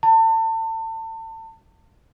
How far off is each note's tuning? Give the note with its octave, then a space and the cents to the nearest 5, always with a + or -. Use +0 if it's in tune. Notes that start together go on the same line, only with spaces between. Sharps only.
A5 +35